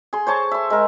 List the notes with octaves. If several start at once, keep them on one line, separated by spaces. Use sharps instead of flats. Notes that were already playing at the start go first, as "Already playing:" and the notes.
G#4 C6
C5 C#5 A5 C#6
E5 C6
G#3 A#4